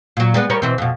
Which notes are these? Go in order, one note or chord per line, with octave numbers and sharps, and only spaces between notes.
A#2 F#3
G3 G#3 B3
G3 A#4 C#5
B2 E3 C4
F2 B2